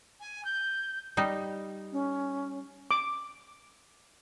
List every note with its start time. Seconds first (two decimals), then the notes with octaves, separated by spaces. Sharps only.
0.20 G#5
0.45 G6
1.17 G3 D#4
1.92 C#4
2.91 D6